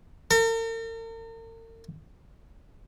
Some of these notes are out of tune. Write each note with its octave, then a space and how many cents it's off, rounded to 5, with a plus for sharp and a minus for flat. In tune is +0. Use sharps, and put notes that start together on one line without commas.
A#4 -45